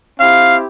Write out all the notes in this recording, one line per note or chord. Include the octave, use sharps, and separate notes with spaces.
C4 E4 G4 F5